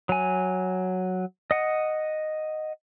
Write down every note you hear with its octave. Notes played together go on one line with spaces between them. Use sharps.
F#3 G#5
D#5 F#5